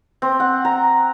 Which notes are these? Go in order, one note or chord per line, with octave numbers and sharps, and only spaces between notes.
C4
F#5
A#5